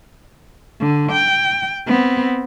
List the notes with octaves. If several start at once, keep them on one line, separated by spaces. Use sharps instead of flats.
D3
G5
B3 C4